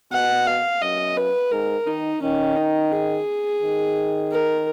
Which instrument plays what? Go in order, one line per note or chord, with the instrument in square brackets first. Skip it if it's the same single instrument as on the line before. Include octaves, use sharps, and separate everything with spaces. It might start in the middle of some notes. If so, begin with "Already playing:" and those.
[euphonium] B2 [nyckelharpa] F#5
[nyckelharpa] F5
[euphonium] F#2 [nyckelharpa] D#5
[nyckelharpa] B4
[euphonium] G#2 [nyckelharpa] A#4
[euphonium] D#3 [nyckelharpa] D#4
[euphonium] D#3 [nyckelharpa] C#4
[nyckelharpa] D#4
G#4
[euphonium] D#3
[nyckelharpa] A#4